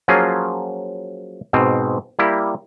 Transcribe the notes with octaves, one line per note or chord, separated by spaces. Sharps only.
F3 F#3 A#3 C#4 F4 G#4
G#2 B2 C4
G3 A#3 E4 G4